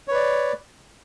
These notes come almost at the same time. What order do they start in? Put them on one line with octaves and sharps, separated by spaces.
C#5 B4 D5